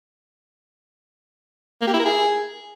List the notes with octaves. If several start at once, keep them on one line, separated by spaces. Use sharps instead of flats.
A#3
G4
E4
A#4
G#4